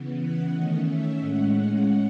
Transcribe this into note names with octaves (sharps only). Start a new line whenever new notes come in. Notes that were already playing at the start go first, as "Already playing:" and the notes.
Already playing: C#3 E3 B3
F#5
D#3 A3 C#4 D#5
E5
A2 G#3 C#4 F#5
F#5